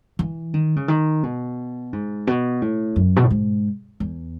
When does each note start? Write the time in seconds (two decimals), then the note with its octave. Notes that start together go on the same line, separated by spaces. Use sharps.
0.19 E3
0.54 D#3
0.76 C#3
0.88 D#3
1.23 B2
1.93 G#2
2.27 B2
2.62 A2
2.96 F#2
3.16 B2
3.24 A2
3.30 G#2
4.00 E2